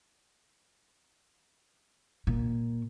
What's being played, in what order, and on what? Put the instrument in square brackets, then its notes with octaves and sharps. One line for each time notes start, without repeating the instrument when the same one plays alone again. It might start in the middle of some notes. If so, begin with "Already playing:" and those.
[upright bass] A#2